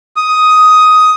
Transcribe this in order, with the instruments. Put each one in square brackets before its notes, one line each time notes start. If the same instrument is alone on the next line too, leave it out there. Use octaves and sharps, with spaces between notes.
[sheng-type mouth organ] D#6